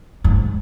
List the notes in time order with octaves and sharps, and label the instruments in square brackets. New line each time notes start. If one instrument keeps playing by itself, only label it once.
[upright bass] G#2